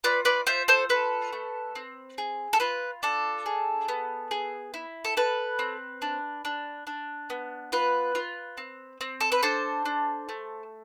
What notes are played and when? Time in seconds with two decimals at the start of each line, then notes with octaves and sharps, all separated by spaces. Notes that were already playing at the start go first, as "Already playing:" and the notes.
0.04 F4 B4 D5
0.25 B4 D5
0.47 F4 C5 E5
0.68 A4 C5
0.89 A4 B4
1.33 A3
1.75 C4
2.18 G#4
2.53 A4
2.60 F4 B4
3.03 D4 A4
3.46 G#4
3.88 B3
4.31 G#4
4.74 E4
5.05 A4
5.17 A4 B4
5.59 C4
6.02 D4
6.45 D4
6.87 D4
7.30 B3
7.72 F4 B4
8.15 F4
8.57 C4
9.01 C4
9.21 A4
9.32 B4
9.43 D4 A4 C5
9.85 D4
10.29 A3